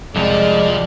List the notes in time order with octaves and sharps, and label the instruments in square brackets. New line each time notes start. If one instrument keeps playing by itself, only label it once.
[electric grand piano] C2 F2 [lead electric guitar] F3 [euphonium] G#3 [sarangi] D5